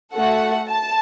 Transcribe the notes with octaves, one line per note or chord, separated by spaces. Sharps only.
A3 F#4 A4 F#5
A5